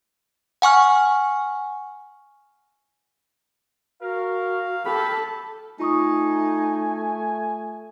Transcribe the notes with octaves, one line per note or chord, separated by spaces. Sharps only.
F#5 G#5 C#6 F6
F#4 A#4 F5
G4 A4 B5
A3 D#4 F4 G#5 C#6 D#6